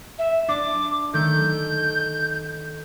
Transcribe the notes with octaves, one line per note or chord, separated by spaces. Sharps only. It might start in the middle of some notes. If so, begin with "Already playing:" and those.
E5
D4 D6
D#3 A3 G6